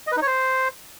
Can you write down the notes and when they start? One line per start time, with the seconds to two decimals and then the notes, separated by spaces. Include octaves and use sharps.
0.07 D#5
0.12 B4
0.17 D#4
0.22 C#5
0.27 C5